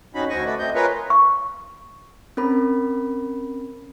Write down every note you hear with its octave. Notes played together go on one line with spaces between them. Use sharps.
F2 C#4 D#4 F#4 B5
D2 C4 F#4 D#5 G#5 C#6
A3 F#4 B4 D5
A3 C4 D#5 G6
F4 G#4 A#4 B4 C#5
C#6
C4 C#4 A#4 B5